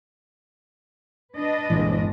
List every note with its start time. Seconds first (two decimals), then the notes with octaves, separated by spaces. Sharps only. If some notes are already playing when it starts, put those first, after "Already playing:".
1.35 D4 B4 D#5
1.70 G1 C2 A#2 E3 G#3